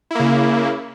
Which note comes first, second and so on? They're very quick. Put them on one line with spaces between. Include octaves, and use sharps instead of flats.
E4 A#3 C#3